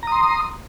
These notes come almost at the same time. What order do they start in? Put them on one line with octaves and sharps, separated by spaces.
A#5 D#6 C6